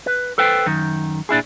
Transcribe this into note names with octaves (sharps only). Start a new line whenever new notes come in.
B4
A4 B4 C5 G5
F#2 D#3
A#2 D4 E4 G#4